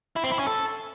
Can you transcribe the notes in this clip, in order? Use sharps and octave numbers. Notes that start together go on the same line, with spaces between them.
E4
C4
E4
C#4
A4